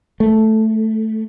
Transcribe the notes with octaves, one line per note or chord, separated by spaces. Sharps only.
A3